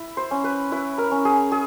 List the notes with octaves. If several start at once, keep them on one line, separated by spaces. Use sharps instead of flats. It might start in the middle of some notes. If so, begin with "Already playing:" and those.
Already playing: E4
C5
C#4
B4
E4 B4
A#4
C#4
G#4
G#4